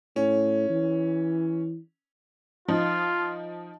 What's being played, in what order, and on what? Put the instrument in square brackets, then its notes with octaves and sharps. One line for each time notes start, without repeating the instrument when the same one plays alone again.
[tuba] A2 [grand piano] C#4
[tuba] E3
[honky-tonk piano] F3 D#4 [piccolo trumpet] F4